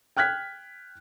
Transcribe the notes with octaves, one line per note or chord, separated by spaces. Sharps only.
G5 F6 F#6 G#6 B6